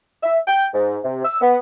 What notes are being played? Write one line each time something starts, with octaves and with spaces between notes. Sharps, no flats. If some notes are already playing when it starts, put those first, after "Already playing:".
E5
G5
G#2
C3
E6
B3